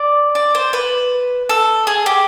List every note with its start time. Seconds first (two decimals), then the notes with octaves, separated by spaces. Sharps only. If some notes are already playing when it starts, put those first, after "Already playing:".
Already playing: D5
0.35 D5
0.55 C5
0.73 B4
1.49 A4
1.87 G#4
2.06 G4